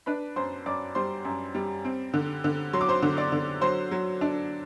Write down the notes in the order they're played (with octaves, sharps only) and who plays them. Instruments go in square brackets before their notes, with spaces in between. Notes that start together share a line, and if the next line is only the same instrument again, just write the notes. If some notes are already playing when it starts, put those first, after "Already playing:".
[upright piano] D4 B4 B5
F#2 C5 C6
F#2 D5 D6
G3 C5 C6
F#2
G3
C4
D3
D3
F#3 C6
D6
C5 C6
D3
D5 D6
D3
F#3 C5 C6
F#3
D4